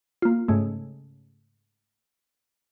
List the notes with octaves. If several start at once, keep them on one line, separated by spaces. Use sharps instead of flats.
A#3 F4
G#2 C#3 A3